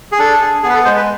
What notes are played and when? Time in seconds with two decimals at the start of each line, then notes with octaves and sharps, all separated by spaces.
0.12 G#4
0.19 D4 A4
0.41 G#4
0.63 B3 G#4
0.69 B4
0.74 A4
0.85 G#3 C5
0.96 B4